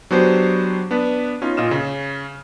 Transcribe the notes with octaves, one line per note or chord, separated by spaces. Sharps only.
F#3 B3 D4 F#4 G4 C5
B3 D4 B4
B3 C#4 D#4 F4
A#2 F4 D#5 F6 E7
C#3 C#4